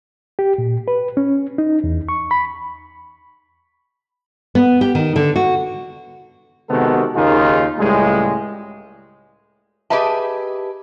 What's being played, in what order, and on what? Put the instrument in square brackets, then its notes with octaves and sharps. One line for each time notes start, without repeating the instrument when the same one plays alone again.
[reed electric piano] G4
A#2
B4
C#4
D#4
E2
C#6
B5
[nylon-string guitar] B3
G4
D#3
D3
F#4
[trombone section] C3 D#3 G#3 B3 F#4 A4
D#2 C#3 A#3 D#4 F4 G#4
C#2 A2 C#3 G3 G#3
[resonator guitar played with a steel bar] G4 G#4 B4 D#5 E5 A5